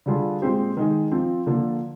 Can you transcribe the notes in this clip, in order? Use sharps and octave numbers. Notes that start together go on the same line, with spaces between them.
D3 G3 D4 F4 G#4
A#2 G#3 C4 G4 C5
D#3 G#3 D#4 G#4
F3 C4 F4
D3 F3 A#3 F4